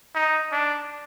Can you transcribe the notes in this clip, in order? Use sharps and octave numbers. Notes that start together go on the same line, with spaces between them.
D#4
D4